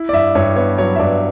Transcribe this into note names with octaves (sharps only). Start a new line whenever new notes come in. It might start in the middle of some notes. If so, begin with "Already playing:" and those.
Already playing: E4
D5
G2 E5
G2 C#5
B3 C#5
F#3 C#5
E5
G2 D5